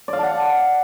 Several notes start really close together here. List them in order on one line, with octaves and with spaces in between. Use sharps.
D5 F5 A5 F#5